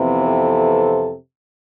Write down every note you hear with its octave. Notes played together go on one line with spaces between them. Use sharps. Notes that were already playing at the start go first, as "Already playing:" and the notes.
Already playing: F2 C3 E3 B3
A4 C5